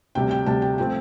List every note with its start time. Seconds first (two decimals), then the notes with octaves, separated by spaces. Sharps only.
0.15 D2 C3 G3 G5
0.31 G5
0.46 D2 C3 G3 A5
0.62 G5
0.78 F3 A3 C4 G5